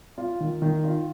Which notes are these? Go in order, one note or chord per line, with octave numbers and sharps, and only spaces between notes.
F4
D#3
D#3
F4